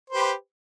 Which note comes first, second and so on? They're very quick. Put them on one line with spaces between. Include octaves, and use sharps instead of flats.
C5 B4 G4